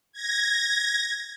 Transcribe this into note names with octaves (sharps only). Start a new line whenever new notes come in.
G#6 A#6